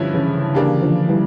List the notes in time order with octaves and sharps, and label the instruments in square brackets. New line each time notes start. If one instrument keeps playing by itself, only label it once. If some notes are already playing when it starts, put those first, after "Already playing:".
Already playing: [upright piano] G2 F3 C#4 E4 [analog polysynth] D3
[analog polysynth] C#3 E3
[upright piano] C#3 G3 A#3 D4
[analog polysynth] D3 F3
E3 G3